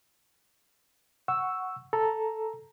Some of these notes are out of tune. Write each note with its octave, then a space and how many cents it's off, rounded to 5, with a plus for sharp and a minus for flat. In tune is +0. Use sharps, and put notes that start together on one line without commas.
F#5 +0 C#6 +0 E6 +0
A4 +0 A#5 +0